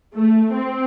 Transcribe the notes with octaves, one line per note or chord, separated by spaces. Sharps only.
A3
C4